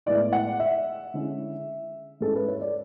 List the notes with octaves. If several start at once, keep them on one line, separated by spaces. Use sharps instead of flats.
A2 G#3 B3 E4 D5
F#5
E5
D3 G#3 C#4 E4
G#2 G#3 C#4 E4 A4
B4
C#5
D5